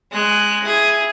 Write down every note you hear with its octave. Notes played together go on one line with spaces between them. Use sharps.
G#3 F#6
E4 G#4